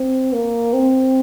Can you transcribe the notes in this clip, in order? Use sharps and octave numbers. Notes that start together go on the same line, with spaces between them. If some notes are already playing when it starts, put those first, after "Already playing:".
Already playing: C4
A#3
C4